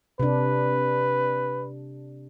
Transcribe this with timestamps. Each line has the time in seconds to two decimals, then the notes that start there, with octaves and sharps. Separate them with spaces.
0.20 C3 D4 B4